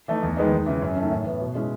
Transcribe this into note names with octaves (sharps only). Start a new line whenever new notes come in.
E3 A3 D#4
E2
D#3 G#3 B3 D#4
E2
C#3 E3
F#2
D#3 A3 C#4
A2
E3 B3
B2
G#3 C#4 E4